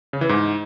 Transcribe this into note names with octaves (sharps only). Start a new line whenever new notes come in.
C#3
E3
G#2